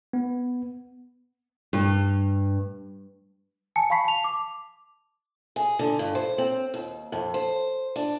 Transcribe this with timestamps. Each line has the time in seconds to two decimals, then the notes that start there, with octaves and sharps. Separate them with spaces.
0.13 B3
1.73 G2
3.76 G#5 A5 C#7
3.90 F5 A5 B5 C#6 B6 C7
4.05 A5 F7
4.24 D6
5.56 G#4
5.79 D3
5.99 G2
6.15 C5
6.38 C4
6.74 D#2
7.12 F2
7.34 C5
7.96 D4